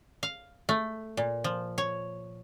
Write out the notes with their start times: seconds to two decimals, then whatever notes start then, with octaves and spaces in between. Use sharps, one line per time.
0.23 F5
0.69 A3
1.17 A#2
1.44 F3
1.78 C#5